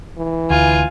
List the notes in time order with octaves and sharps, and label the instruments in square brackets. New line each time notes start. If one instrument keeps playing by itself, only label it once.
[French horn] E3
[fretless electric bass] D2 [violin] F4 [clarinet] G#5